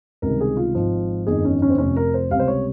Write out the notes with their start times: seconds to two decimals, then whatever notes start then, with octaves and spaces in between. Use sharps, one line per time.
0.22 C#2 C3 D#3 G3 A#4
0.41 G#4
0.57 F4
0.75 G#1 G#2 F3
1.27 G1 F2 D#3 G#4
1.45 C#4
1.62 C#4
1.70 C4
1.78 F1 F2 C3 C#4
1.96 A#4
2.14 C5
2.31 C#2 C3 G3 F5
2.39 C5
2.48 C#5